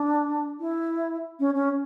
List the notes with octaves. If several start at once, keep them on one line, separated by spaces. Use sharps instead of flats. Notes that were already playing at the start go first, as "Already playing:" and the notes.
Already playing: D4
E4
C#4
C#4